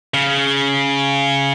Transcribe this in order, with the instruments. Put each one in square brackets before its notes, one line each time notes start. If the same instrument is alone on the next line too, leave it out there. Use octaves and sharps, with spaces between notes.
[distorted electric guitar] C#3